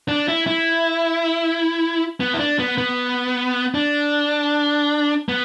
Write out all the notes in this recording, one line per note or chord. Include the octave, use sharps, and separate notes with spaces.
D4
E4
E4
B3
E4
D4
B3
B3
D4
B3